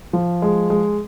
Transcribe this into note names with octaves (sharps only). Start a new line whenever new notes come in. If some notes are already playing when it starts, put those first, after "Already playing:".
F3
G#3
G#3